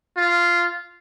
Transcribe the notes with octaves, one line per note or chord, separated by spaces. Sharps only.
F4